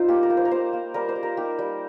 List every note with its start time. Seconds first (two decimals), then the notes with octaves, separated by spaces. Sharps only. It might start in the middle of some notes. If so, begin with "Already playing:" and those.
Already playing: G3 D#4 F4 C5
0.08 A#3 G4
0.23 A#4
0.30 A#3
0.37 C5
0.45 A#4
0.51 A#3 C5
0.73 A#3
0.94 G3 A#4
1.09 C5
1.16 G3
1.23 A#4
1.37 D#4 G4
1.59 G3